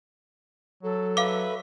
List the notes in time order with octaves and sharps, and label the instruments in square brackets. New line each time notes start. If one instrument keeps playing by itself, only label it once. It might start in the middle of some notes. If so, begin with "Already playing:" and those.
[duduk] F#3 [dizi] A4
[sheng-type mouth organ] B4 E5 [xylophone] F5 D6